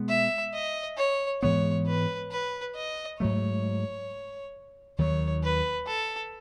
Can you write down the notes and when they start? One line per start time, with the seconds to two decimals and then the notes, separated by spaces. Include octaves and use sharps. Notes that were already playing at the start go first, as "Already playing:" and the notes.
Already playing: B2 G#3 B3
0.09 E5
0.54 D#5
0.97 C#5
1.42 G#2 E3 G#3 B3 C#5
1.86 B4
2.32 B4
2.75 D#5
3.20 G#2 F#3 A3 C#5
4.98 D#2 D#3 F#3 C#5
5.43 B4
5.87 A4